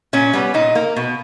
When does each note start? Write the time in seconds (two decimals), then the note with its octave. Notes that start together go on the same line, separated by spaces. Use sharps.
0.13 A#2 C#4
0.33 G3 B3
0.54 A#2 D#4
0.75 A#3
0.96 B2